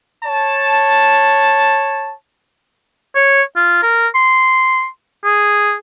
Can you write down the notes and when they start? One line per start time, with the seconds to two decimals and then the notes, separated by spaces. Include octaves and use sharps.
0.24 C#5 A5
3.15 C#5
3.56 F4
3.83 A#4
4.15 C6
5.25 G#4